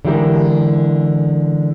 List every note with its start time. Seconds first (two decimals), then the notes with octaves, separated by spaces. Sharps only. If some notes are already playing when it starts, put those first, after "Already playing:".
0.05 D3 E3 G#3 E4 G4 A#4